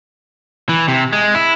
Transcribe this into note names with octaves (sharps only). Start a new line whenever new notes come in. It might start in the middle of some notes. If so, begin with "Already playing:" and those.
E3
C3
G#3
E4